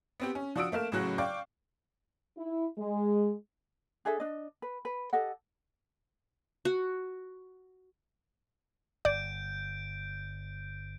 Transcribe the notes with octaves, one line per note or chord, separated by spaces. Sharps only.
B3 C4 G4
C#4
F3 D4 F#4 D#6 E6 D7
A3 A#3 F6 E7
A1 A2 C#3 F#3 F#4 F#6
D5 F5 G5 C#6 D6
E4
G#3
D4 G#4 A4 E5
D4 D#5
B4
B4
G4 A4 D#5 F#5
F#4
G1 D5 G6 D7